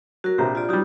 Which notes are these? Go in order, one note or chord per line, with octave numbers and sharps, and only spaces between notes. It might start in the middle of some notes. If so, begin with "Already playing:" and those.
F#3 F#4 A#4
A#1 C3 G4
F4 G4 D5
F#3 G3 D#4 F4 G4